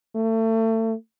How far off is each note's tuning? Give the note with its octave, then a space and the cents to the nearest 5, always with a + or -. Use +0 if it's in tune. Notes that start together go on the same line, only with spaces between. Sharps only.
A3 +30